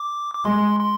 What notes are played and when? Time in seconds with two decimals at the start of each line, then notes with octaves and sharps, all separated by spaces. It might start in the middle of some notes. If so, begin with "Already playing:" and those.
Already playing: D6
0.34 D6
0.45 G#3 C6
0.80 C6